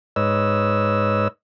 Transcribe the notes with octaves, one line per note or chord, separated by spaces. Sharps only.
G#2 B4 C#5 D#5 E6